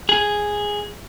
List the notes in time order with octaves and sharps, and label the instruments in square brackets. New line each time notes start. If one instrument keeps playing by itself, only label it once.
[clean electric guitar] G#4